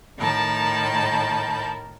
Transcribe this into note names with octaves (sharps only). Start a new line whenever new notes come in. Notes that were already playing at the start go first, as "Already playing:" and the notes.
A2 D#3 A#4 A5 B5 G6